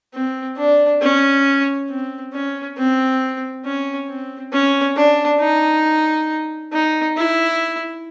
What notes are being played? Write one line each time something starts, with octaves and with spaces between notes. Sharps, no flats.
C4
D4
C#4
C4
C#4
C4
C#4
C4
C#4
D4
D#4
D#4
E4